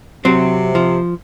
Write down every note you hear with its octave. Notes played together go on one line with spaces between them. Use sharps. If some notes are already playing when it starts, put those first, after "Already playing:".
C3 F#3 C4
F3